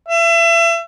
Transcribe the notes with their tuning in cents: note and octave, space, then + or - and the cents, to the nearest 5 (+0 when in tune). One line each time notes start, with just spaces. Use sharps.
E5 +35